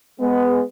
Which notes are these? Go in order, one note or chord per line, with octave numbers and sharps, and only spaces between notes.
G#3 B3